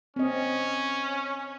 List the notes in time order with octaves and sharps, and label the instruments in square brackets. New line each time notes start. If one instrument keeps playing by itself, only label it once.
[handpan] C4 D#5 [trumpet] C#4